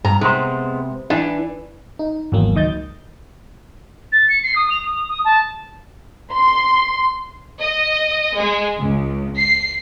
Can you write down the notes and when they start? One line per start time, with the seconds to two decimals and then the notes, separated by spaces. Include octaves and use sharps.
0.05 G2 A#5
0.21 C3 G#3 B3 C5
1.10 E3 D4
1.99 D#4
2.32 G#1 E2 F#3 A#3
2.55 C#2 D#3 D#5 G6 A6
4.12 A6
4.29 C#7
4.43 C7
4.56 D#6
4.70 F7
4.85 D#6
5.08 D#6
5.25 A5
6.35 C6
7.59 D#5
8.37 G#3
8.78 C#2
9.37 C7